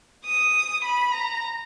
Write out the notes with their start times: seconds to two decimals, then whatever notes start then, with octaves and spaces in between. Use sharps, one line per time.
0.25 D#6
0.84 B5
1.14 A#5